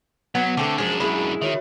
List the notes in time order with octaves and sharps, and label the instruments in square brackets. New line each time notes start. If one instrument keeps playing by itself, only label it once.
[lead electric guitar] F#3 [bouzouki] B3 [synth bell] F#5 G#6 B6
[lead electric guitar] D3 [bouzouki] A3 C4 A4 [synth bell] D6
[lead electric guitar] F#2 D4 [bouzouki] F3 G#3
[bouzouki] G#3 E4 [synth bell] G#4 B5
[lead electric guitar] D#3 [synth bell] F#4 C#5 E5